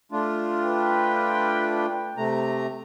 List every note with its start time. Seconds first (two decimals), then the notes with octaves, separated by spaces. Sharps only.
0.12 A3 D4 F4
0.63 B4 G5
2.17 C3 A3 A#5